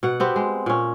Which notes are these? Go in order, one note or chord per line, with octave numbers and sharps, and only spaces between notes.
B2 F#5
B3 C4 G4
G#3
A#2 C#4